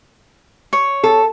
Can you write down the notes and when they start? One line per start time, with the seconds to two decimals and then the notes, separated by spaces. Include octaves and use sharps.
0.73 C#5
1.03 A4